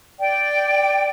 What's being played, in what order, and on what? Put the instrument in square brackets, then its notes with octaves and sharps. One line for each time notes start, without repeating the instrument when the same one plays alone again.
[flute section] D5 G5